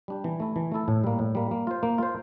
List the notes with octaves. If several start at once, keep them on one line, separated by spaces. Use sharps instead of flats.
G3 D4 G4
E3
A3 E4 A4
E3
A3 E4 A4
A2
G3 A#3
A2
G3 A#3
A#3
F4 C5
A#3
F4 C5